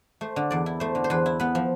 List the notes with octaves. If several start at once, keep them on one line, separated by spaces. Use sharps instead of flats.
A3 C5
D3
E2 D5
E4
A3 C5
D3
C5
E2 B4
E4
B3 B4
F3